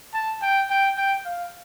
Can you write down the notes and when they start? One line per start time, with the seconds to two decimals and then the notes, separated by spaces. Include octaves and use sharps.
0.14 A5
0.42 G5
0.70 G5
0.97 G5
1.25 F5